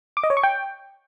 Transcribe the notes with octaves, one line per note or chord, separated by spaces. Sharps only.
D6
D#5
C#5
C#6
G5